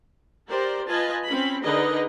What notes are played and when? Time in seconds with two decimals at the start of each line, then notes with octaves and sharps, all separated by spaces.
0.47 G4 A#4 C5 D5
0.87 F4 B4 D#5 G#5 A5
1.26 C4 C#4 B5
1.63 D3 D#4 G#4 A#4 B4 D#5